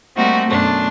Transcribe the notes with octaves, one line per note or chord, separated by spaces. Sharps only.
G3 A3 A#3 C4 D#4 F#4
F#2 B2 A3 D4 C6